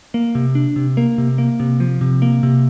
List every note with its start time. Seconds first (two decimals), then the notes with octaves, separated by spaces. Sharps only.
0.14 A#3
0.35 C3
0.55 D4
0.76 C3
0.97 A#3
1.18 C3
1.38 A#3
1.60 C3
1.80 F3
2.01 C3
2.22 A#3
2.43 C3